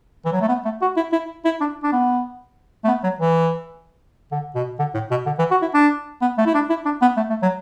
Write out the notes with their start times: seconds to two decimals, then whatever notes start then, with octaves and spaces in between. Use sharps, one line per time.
0.25 E3
0.32 F#3
0.41 A3
0.48 B3
0.65 A3
0.81 F#4
0.96 E4
1.12 E4
1.45 E4
1.60 D4
1.83 D4
1.92 B3
2.84 A3
2.87 B3
3.03 F#3
3.19 E3
4.31 D3
4.55 B2
4.79 D3
4.94 A2
5.11 B2
5.26 D3
5.39 E3
5.51 F#4
5.62 E4
5.74 D4
6.21 B3
6.38 A3
6.46 E4
6.54 D4
6.70 E4
6.85 D4
7.01 B3
7.17 A3
7.30 A3
7.42 F#3